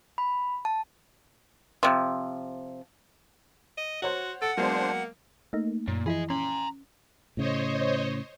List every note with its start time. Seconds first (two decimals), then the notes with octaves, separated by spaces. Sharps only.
0.18 B5
0.65 A5
1.83 C3 F3
3.78 D#5
4.02 F#4 C5 C#5 F#5
4.42 A4 F#5 D7
4.57 F#3 G#3 A#3 B3 D4 C5
5.53 A3 A#3 D#4
5.88 F#2 A#2
6.06 E3 F3 E4 G#4 D#5
6.30 C#4 A#5 C6
7.37 A2 C#3 C5 C#5 D#5